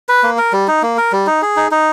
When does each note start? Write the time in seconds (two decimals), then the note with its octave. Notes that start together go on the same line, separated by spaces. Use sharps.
0.09 B4
0.23 A#3
0.38 A#4
0.53 G3
0.68 D#4
0.83 A#3
0.98 A#4
1.12 G3
1.27 D#4
1.42 G#4
1.56 D#4
1.71 D#4